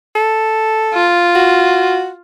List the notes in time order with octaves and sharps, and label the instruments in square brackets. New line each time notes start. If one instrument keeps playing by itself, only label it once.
[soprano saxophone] A4
[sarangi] F4
[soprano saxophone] F#4